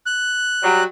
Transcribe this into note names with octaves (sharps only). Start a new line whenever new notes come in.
F#6
F#3 G3